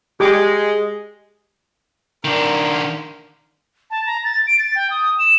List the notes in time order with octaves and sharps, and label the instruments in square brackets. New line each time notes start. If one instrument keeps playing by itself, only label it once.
[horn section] G#3 [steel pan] G4 D6
[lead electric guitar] D#3 D4 [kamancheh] A#4
[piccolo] A5
A#5
A6
D7
A6
G5
D#6
E7